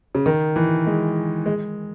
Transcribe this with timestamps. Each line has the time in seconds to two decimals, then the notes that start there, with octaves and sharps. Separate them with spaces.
0.15 C#3
0.26 D#3
0.56 E3
0.86 G#3
1.46 G#3